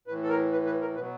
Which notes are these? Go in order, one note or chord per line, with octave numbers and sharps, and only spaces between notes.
A2 E3 B4
A4
A#4
B4
B4
A#4
B2 F#3 B4